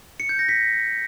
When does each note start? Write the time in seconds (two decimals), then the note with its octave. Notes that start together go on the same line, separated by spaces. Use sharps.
0.20 C#7
0.29 G6
0.39 A#6
0.49 B6